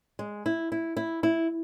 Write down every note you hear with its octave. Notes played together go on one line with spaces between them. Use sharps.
G#3
E4
E4
E4
E4